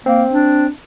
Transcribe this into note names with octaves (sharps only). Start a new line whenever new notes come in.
A#3 C4
D4